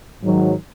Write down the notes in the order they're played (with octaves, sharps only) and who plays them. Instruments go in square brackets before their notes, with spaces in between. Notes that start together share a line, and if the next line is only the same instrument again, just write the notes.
[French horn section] G#2 D#3 F#3